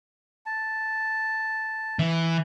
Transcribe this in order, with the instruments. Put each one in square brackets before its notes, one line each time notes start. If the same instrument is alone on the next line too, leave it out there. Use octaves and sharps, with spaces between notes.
[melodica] A5
[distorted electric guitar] E3